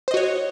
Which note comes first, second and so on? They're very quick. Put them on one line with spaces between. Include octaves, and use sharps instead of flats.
C5 D#5 F#4 C#5